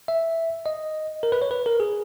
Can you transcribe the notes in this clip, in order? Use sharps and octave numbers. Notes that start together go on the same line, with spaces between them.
E5
D#5
A#4
B4
C#5
B4
A#4
G#4